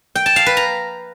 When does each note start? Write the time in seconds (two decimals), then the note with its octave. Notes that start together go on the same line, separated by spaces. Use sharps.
0.15 G5
0.26 A5
0.36 F5
0.46 B4
0.57 A#5